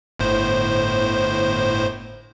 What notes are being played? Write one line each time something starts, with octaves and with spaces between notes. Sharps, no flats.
G1 A2 C5